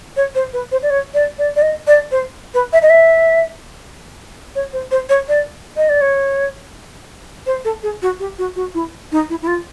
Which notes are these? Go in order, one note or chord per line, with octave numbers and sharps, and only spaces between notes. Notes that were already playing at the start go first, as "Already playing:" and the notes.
C#5
C5
B4
C5
D5
C#5
D5
D5
D5
D#5
D5
C5
B4
E5
D#5
E5
C#5
C5
C5
C#5
D5
D#5
D5
C#5
C5
A4
G#4
F#4
G4
F#4
F#4
E4
D#4
E4
E4
F4